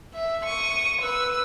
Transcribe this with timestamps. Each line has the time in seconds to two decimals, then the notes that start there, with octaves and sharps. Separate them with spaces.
0.14 E5
0.45 C#6 D#6
1.02 B4 E6